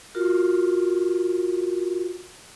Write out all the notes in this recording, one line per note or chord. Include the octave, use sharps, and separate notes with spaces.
F4 F#4 A#4